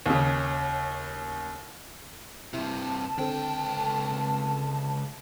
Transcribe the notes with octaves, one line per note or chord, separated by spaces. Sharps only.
D#2 C#3
G2 C3 E4 A5
C#2 D3 C4 A4 G5